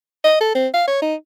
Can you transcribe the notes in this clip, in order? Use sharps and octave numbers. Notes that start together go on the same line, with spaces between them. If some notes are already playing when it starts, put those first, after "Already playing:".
D#5
A4
C4
F5
C#5
D#4